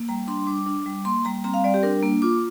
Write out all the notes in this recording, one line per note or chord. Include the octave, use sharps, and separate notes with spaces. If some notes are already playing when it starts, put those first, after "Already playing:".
Already playing: A#3
G3 A#5
D4 C6
G3 D6
D4
G3
A#3 C6
G3 A#5
C4 A#5
F5
G3 D5
G4
D4 A#4
A#3
F4 D6